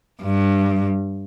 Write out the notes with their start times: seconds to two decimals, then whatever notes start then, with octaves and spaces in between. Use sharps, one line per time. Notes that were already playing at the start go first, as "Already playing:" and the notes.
0.21 G2